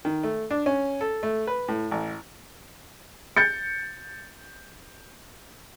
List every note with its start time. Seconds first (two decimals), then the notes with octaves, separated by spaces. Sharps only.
0.05 D#3
0.23 A3
0.51 D4
0.66 C#4
1.01 A4
1.23 A3
1.47 B4
1.68 A2
1.91 A1
3.37 G6 A6 C#7